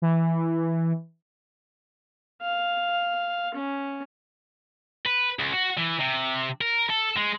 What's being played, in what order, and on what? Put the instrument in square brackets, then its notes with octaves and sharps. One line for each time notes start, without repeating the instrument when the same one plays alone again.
[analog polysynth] E3
[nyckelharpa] F5
C#4
[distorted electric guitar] B4
C#2
F#4
E3
C3
A#4
A4
G#3